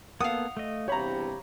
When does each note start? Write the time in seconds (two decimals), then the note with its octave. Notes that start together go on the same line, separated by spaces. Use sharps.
0.20 A#3 B3 A4 F5 F#5 D#6
0.57 A3 D#5
0.88 E2 G2 C3 G4 C#5 A#5 B5